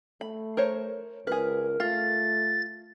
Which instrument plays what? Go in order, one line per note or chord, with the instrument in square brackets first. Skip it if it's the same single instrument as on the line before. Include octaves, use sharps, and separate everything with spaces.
[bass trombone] A3 [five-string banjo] B5
[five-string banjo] A#4 C5 C#5
[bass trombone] C#2 [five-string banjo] G#4 B4 [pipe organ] A#4
[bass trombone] A3 [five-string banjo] F4 [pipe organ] A6